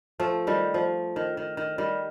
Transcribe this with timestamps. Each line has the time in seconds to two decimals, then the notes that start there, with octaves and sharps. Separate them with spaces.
0.20 F3 A3
0.47 D#3 G3
0.74 F3
1.16 D#3
1.37 D#3
1.57 D#3
1.78 D#3 G3